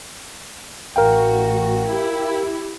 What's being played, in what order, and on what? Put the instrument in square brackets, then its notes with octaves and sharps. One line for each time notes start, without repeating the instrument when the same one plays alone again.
[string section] A1 F#4 [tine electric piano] A#4 F5 G5
[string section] E4 G4